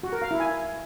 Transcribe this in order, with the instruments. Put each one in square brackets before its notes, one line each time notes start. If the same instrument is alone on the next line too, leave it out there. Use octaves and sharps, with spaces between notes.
[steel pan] F#4
A#4
F5
E4
G#5